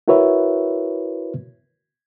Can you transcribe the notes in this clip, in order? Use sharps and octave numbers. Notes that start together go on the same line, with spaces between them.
E4 F#4 A#4 B4 C#5 E5